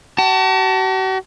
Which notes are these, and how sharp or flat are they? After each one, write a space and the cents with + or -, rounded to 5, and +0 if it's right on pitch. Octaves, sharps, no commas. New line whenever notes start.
F#4 +45 A5 +15